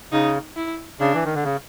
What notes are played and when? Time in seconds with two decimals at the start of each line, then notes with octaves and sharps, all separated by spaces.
0.12 C#3 D#4
0.56 E4
1.00 C#3 D4
1.14 E3
1.25 D#3
1.34 D3
1.44 C#3